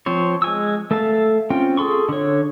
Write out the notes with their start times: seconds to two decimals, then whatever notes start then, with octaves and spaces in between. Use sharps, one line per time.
0.06 F3 C4 C5 C#5
0.42 G#3 G#5 E6
0.91 A3 A4 E5 F5 A5
1.50 C4 C#4 F4 G5
1.77 G#4 A4 C6 C#6
2.09 D3 C#5